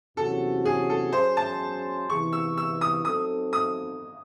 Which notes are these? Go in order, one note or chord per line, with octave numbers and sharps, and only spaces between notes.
E2 C3 F#3 C#4 F#4 A4
G#4
A4
F#3 C#4 G#4 C5
A5
E2 C3 E3 C#6
E6
E6
D#6
F#3 C4 D#4 A4 D#6
D#6